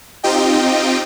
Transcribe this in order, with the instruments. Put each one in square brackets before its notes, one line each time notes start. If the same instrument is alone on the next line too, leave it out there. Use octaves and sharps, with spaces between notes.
[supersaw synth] C4 D#4 F4 G4 D#5 G5